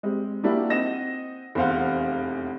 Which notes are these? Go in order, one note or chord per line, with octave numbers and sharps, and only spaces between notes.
G3 G#3 C4
G3 A#3 D4 E4 F#4 G4
C4 D#4 D#5 F#5 A#6 E7
F1 E2 C5 F5 F#5